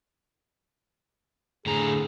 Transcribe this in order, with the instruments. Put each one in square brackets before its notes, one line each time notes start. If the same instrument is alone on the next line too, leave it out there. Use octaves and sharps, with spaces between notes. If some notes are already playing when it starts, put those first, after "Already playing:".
[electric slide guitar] A2 D3 A#5 [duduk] G#4